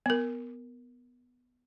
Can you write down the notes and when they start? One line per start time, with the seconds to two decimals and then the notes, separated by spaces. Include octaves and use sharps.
0.06 B3 A#4